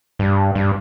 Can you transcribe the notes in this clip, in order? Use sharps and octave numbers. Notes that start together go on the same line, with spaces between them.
G2
G2